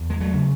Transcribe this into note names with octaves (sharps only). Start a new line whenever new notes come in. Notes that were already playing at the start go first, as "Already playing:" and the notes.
Already playing: E2
G#3
F#3 A3
C#3